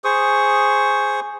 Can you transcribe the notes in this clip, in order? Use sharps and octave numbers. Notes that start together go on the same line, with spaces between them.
G#4 C5 C#6 D#6